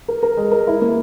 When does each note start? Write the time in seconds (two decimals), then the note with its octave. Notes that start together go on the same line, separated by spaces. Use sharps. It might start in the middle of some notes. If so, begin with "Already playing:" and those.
0.08 A#4
0.23 A#4
0.37 G#3
0.52 A#4
0.67 E4
0.82 A#3